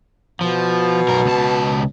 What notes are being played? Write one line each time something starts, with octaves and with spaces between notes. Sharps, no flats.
B2 F3
B1 A#4
C#2 A5